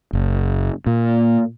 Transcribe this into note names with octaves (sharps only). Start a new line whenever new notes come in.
F#1
A#2